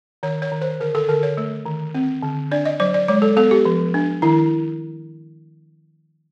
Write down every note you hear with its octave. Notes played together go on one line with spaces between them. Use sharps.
D#3 C#5
C#5
D#3
C5
D3 A#4
A4
D3 A#4
C#5
A3
D#3
C4
D3
D4 D5
D#5
F#3 D5
D5
G#3 C#5
A4
B3 A4
G4
F3
D4
D#3 E4